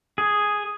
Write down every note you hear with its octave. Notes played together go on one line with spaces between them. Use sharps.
G#4